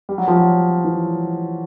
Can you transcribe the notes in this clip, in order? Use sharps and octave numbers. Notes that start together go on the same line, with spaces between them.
G3
F#3
F3
F#3
E3